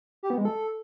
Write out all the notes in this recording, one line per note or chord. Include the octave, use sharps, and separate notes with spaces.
G4
B3
G#3
A4